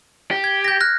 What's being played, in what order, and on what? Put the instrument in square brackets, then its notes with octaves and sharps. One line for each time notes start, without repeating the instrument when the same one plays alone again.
[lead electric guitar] G4
[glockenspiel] G#6
G6 A#6
F6 F#6 A#6